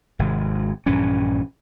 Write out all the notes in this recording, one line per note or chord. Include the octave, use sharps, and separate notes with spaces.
G#1 C3 G#3
A#1 G2 E3 C#4